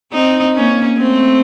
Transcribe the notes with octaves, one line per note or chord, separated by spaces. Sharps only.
C4 D#4
A#3 C#4
A3 C4